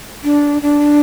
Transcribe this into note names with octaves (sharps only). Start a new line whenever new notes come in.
D4
D4